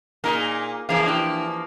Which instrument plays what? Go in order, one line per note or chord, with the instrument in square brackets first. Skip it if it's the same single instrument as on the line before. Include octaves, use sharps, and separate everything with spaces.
[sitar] A#2 D#4 A#4 [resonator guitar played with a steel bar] A#3 G#4
[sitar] E3 F3 A#3 [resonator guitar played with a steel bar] E4 G#4 F5
[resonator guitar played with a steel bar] D4 E4 G4